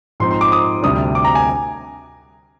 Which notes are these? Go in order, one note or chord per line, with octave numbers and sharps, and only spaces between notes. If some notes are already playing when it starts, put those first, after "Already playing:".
G#2 F3 C4 D#4 C6
C6
D6
D#6
D2 C3 G3 D4 D#6
D6
A#5
G#5